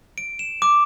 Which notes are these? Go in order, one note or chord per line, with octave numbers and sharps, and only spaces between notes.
D7
E7
D6